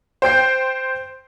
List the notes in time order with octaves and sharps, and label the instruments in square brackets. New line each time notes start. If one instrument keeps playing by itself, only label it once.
[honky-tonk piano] C5 G5 G6 C7